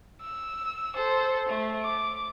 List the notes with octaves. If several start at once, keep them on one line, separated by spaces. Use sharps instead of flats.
E6
A4 C5
A3
D6